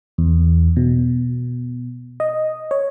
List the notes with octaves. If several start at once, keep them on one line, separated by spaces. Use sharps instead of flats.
E2
B2
D#5
C#5